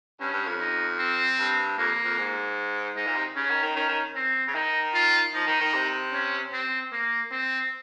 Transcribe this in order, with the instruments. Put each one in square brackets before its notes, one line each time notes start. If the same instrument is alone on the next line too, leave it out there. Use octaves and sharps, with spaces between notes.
[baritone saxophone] G2 [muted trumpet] C#4
[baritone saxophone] G2
F2
[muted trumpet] D#4
C4
[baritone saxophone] G2
[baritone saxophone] F2 [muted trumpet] A#3
[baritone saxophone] F2
G#2
[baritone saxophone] G#2 [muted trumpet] D#4
[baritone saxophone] A#2
C3
[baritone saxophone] C#3 [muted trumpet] C#4
[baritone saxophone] D#3
D#3
[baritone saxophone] D#3 [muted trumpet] C#4
[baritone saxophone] D#3
[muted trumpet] C4
[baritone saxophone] C#3
[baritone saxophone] D#3 [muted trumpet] D#4
[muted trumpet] F4
[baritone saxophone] F3 [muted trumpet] D#4
[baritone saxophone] D#3
D#3
C3
[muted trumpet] C#4
C4
A#3
C4